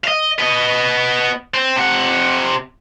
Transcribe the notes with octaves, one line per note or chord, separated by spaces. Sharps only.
D#5 F5
B3 D#5
C4
C3 F#5